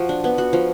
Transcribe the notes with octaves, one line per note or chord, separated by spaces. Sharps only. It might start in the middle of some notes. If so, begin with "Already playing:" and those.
Already playing: F3 F#4
D4
B3
F#4
F3